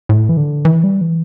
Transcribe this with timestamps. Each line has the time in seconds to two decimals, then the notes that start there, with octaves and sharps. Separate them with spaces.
0.09 A2
0.29 E3
0.37 D3
0.65 E3
0.84 G3
1.01 E3